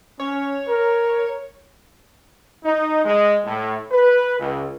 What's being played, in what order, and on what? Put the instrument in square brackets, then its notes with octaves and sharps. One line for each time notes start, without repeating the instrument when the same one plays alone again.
[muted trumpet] C#4 [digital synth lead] C#5
[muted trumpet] A#4
[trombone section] D#4
G#3
A2
B4
C#2